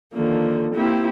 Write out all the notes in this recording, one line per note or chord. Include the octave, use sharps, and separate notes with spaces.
D3 D#3 F3 A#3
A#3 C4 E4 G4